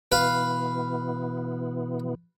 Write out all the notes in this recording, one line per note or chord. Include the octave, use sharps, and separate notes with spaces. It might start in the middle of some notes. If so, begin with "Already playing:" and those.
B2 E3 B3 B4 F5